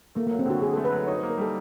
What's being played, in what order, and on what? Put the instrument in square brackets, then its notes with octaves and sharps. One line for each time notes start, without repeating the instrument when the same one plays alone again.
[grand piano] A3 [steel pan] A#3
[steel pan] A#3
[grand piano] F#3
[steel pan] C4
[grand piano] D3 [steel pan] F#4
[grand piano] D3 [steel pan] G#4
[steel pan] A4
[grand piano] A3
[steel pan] B4
[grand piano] F#3
[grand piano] D#4 [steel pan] C#5
[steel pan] C5
[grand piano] A#3
[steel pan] A#4
[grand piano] G3 [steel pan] A4